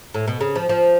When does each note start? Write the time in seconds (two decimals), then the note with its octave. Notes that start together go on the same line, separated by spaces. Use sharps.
0.14 A2
0.27 B2
0.41 C#3
0.55 F3
0.69 F3